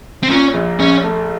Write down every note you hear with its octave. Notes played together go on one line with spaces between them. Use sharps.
C4
A#2 C#4
A#1
A#1 C#4
A3